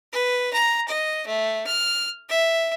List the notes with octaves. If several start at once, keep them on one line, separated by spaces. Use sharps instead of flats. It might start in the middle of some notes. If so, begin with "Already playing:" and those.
B4
A#5
D#5
A3
F6
E5